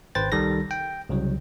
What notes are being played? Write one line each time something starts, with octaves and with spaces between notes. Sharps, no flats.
G#1 B4 C5 G5 A6
C2 D#3 G3 A4 A#4 A#6
G5
C2 C#3 F#3